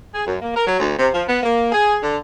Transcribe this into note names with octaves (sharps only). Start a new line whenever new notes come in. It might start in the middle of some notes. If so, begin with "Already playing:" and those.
G#4
F#2
A#3
A#4
F#3
D2
C3
F3
B3
A#3
G#4
D3